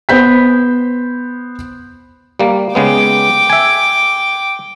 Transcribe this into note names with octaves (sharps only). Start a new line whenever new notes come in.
B3 C5 G6 B6
G3 A#3
C#3 G#3 B3 G5 D6
E5 G#5